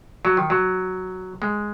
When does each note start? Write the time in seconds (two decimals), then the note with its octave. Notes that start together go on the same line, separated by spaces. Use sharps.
0.25 F#3
0.37 D#3
0.50 F#3
1.42 G#3